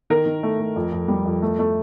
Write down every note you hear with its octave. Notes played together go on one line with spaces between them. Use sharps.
D#3 A#4
D#3
A3
A3
F2
F2
G3
F2
A3
A3